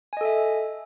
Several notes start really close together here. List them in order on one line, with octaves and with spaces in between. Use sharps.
G#5 D#5 A4 E5